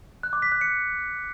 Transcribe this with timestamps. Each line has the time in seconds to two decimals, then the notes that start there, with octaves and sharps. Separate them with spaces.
0.23 F#6
0.33 D6
0.42 B6
0.52 F#6
0.61 C#7